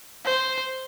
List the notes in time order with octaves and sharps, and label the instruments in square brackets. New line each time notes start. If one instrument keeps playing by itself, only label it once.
[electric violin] C5